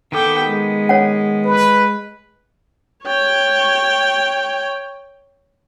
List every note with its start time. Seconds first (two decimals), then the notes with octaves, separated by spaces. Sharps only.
0.12 D#3 B3 A4 G5 D6
0.46 G#3
0.89 C#5 F#5
1.45 B4
3.04 C#5 G5